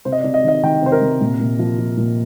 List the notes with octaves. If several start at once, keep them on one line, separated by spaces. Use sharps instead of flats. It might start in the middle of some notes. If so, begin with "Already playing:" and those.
C3 C5
D#5
D5
C3
D#5
D#3 D#5
D#3 G5
C3 C5
A#4
C3
A#2
A#2
F3
F3
A#2